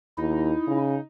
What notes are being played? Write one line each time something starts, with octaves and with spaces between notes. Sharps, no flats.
D#2 D#4 E4
C#3